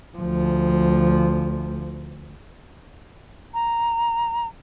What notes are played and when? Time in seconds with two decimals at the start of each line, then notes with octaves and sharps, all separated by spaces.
0.18 D2 F3
3.54 A#5